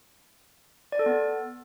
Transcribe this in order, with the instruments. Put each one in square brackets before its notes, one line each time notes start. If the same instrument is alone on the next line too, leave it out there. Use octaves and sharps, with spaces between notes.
[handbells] D5
A4
B3